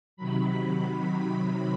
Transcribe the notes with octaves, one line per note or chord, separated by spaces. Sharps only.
C3 D#3 F#3 B5